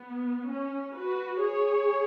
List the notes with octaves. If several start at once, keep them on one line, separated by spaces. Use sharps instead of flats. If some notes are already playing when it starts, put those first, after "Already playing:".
Already playing: B3
C#4
F#4 B4
G#4 C#5